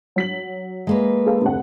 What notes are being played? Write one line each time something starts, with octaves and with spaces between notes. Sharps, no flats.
F#3 B6 F#7
G#3 A#3 B4
G#4 A4 F5
F1 D2 F#5